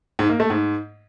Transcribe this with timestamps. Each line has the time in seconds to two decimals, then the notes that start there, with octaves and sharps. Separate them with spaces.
0.19 G#2
0.29 A#3
0.40 A3
0.50 G#2